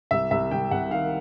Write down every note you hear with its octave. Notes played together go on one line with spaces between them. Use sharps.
C2 E5
C2 E5
C2 G5
C2 F#5
D#3 F5